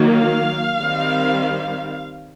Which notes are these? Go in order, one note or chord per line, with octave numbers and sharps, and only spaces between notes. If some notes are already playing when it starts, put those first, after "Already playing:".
Already playing: D#3 F#3 A#3
F5
D#3 G3 C4